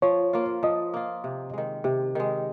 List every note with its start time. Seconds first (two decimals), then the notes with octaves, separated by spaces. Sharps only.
0.02 F3 C#5
0.33 A#3 F4
0.63 F3 D#5
0.94 A#3 F4
1.24 C3
1.54 D#3 G#3
1.84 C3 G4
2.15 D#3 G#3